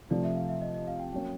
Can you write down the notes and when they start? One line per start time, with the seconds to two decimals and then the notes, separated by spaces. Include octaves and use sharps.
0.10 C3 F3 A3 D5
0.24 E5
0.36 F5
0.48 E5
0.62 D#5
0.74 D#5
0.88 F5
0.99 G5
1.12 F#3 A#3 C#4 G5